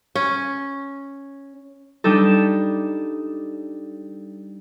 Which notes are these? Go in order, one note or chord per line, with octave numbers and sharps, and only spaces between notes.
C#4
G3 D4 D#4 A4